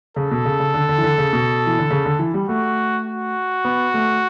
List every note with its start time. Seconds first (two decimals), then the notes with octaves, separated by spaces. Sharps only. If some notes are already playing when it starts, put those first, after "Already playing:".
0.16 C#3 A4
0.31 B2
0.45 C#3
0.60 C#3
0.74 D3
0.89 D3
0.98 E3
1.03 D3
1.18 C#3
1.33 B2
1.67 E3
1.79 D3
1.91 C#3
2.05 D3
2.19 E3
2.34 G3
2.49 A3 F#4
3.06 F#4
3.65 B3
3.94 A3